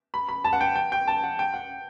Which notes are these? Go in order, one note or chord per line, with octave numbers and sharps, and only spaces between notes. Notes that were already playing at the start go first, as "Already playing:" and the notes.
B5
B5
A5
F#5
G5
G5
G5
A5
F#5
G5
F#5